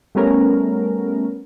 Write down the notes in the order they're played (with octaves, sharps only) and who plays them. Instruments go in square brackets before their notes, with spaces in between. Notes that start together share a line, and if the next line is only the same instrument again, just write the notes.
[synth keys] G3 A3 B3 C#4 A#4